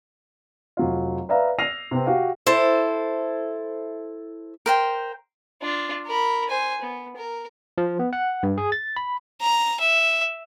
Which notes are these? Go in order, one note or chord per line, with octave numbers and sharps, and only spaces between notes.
F1 F#3 F4
B4 D5 E5 F5 A#5
E6 F6 A#6 C7 D#7 F7
C3 B3 C4
F#4 G4 F5
E4 A4 C5
A#4 C5 G5
D4 F4
A#4 B5
C5 G#5
B3
A#4
F3
B3
F#5
G2
G#4
A6
B5
A#5
E5